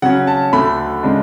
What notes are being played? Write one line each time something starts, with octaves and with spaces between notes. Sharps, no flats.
C#3 F#3 C#4 F#5
A5
D2 D3 A3 B5
C#3 G#3 D4